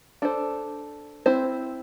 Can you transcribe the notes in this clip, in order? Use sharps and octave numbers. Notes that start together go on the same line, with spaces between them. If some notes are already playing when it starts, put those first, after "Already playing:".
D4 A4 C5
C4 E4 C5